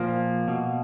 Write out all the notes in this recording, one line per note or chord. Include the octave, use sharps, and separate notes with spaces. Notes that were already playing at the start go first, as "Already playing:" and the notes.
Already playing: A#2 F3 A#3
B2